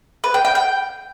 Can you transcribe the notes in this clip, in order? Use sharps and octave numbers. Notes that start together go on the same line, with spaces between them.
B4
G5
G5
G5